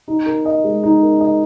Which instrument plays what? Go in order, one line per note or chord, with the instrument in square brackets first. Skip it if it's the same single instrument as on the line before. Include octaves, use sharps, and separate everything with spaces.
[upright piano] D#4
A#4
D#5
G#3
D#4
A#4
D#5